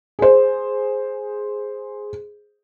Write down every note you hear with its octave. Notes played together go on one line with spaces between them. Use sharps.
G#4 C5